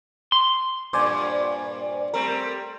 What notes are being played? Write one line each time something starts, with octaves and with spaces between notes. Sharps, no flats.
C6
G2 A#2 C5 D5 G#5
G3 A3 C4 A#4